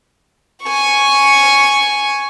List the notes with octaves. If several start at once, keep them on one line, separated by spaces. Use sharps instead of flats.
G#5 C#6